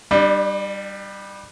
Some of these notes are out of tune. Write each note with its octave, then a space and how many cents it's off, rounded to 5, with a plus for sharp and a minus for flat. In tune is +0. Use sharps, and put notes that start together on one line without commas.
G3 +0 D4 +40